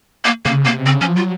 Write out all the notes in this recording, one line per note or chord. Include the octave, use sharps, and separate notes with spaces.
A#3
C#3 A#3
C3 A#3
C#3 C4
F3 C#4
F#3 F4